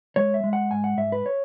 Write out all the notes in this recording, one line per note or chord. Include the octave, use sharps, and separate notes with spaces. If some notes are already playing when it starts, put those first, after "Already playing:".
G#3 C#5
E5
G#3
F#5
G#2 G#5
F#5
G#2 E5
B4
C#5